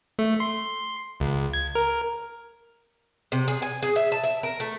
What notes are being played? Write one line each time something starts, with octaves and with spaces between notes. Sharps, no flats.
A3
C6
C#2
G#6
A#4
C3
G#4
G#5
G#4
E5
A5
E5
A#4
A3